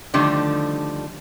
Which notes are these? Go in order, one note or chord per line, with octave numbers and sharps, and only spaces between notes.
D3 D#3 F3 G3 A3 D4